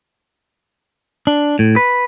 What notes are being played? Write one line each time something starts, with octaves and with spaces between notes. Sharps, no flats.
D4
A2
B4